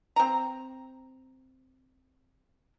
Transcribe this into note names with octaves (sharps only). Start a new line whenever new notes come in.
C4 A#5